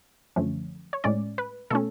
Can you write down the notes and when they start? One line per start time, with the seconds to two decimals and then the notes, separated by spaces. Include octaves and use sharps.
0.36 F#2 D3 F3 A3 C#4
0.93 C#5
1.04 A2 G#3 C#4 D5
1.38 B4
1.70 B2 A3 C#4 A4